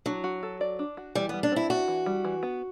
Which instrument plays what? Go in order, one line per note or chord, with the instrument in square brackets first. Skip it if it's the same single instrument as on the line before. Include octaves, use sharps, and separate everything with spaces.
[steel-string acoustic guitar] F#3 [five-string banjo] D4
[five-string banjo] F#4
A4
D5
D4
F#4
[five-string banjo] E3 [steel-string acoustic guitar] G3
[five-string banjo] G3 [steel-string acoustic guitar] B3
[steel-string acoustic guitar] D4
[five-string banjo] C4 [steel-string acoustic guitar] E4
[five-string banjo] E4 [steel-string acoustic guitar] F#4
[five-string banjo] E3
G3
E3
B3